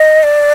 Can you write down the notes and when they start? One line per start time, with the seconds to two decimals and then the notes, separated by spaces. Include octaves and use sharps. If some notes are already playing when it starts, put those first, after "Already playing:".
Already playing: D#5
0.23 D5